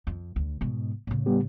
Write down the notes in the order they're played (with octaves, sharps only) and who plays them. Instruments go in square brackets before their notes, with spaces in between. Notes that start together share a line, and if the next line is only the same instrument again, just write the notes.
[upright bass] F2
D2
G#2 B2
A2 C#3
[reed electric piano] G3 B3 G4